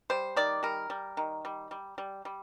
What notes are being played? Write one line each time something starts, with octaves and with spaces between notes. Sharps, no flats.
G3 C5
D#3 D5
G3 A#4
G3
D#3
G3
G3
G3
G3